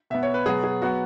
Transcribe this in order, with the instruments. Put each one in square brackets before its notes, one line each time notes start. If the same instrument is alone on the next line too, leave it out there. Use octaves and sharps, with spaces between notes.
[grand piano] B2 B3 E5
C#5
B4
B2 F#3 B3 G#4
G#4
F#3 B3 F#4